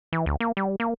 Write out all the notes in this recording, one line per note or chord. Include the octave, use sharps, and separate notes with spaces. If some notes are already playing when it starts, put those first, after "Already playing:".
E3
D2
A#3
G3
A#3